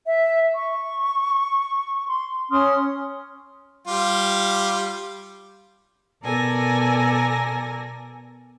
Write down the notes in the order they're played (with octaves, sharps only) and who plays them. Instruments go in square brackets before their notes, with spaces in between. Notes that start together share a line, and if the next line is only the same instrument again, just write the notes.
[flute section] E5
C#6
C6
C#4 C6 D#6 F6
[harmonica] G3 F4 G4
[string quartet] B2 A4 A#4 D5 G#5 A#6